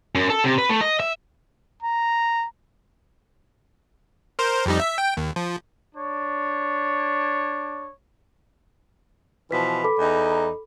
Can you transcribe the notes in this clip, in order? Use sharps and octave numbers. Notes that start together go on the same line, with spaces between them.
F#2
A4
C3
B4
A3
D#5
E5
A#5
A#4 C5
F2 G3 D#4
E5
G5
D#2
F3
D4 C#5
B2 E3 F3 B4 B6
A4 B5 D6
E2 D#4